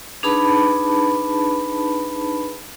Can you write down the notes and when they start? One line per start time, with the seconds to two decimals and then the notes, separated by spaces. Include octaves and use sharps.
0.23 D4 D#4 G#4 B4 A5 B5